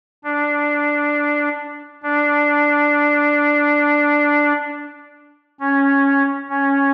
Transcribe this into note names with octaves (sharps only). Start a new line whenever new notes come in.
D4
D4
C#4
C#4